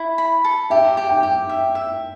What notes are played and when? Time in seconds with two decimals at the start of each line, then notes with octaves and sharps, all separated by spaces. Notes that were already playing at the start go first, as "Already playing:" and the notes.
Already playing: E4
0.18 B5
0.44 A4
0.70 G4 E5
0.97 G4
1.09 G5
1.23 G4
1.49 E5
1.75 E5